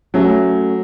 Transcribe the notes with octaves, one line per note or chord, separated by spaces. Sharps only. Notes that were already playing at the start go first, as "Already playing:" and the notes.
F#3 A3 C#4 A4